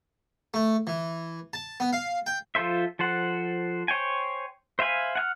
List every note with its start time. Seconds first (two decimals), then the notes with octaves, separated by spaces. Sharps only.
0.54 A3
0.87 E3
1.53 A5
1.80 B3
1.93 F5
2.26 G5
2.55 F3 F4 A4 C5 E5
2.99 F3 A4 C5 F#5
3.88 C5 C#5 G5 G#5
4.79 C5 E5 F5 G#5 B5
5.15 F#5 G#5 F6